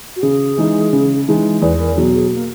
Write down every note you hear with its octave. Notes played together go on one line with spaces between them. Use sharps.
F#4
C#3 G#4
E3 G#3 D#4
C#3
E3 G#3 D#4
E2 B4
A#4
B2 F#3 G#4
G#4
A#3